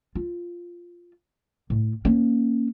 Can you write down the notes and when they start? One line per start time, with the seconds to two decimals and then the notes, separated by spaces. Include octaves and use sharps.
0.15 F4
1.70 A2
2.05 A#3 C#4